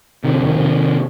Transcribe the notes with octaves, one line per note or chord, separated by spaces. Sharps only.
C3 D#3
D3
F2 D#3
C3
C3